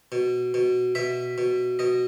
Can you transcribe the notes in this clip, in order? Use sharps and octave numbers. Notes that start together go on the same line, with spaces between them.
B2
B2
B2 E5
B2
B2 D#5